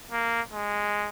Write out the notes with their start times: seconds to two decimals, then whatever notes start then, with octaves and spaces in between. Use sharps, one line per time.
0.12 A#3
0.53 G#3